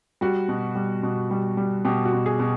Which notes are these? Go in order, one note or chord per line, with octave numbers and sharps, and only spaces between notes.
G3 F#4
B2
G3
B2
G3
G3
B2 G4
F#4
B2
G#4
B2